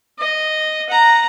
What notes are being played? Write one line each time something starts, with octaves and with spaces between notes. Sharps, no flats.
D#5
F#5 A#5